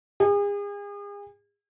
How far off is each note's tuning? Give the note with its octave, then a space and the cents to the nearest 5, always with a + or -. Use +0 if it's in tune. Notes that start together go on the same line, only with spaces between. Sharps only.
G#4 -40